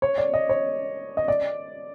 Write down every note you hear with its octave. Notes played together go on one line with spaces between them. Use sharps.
C#5
D5
D#5
C#5
D#5
D5